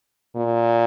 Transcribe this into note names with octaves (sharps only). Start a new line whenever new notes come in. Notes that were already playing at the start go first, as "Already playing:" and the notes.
A#2